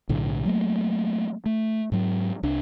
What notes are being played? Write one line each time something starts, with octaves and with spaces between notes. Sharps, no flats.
B1 A2 D3
F#3 A3 A#3
A3
G#2 F#3
C2 D4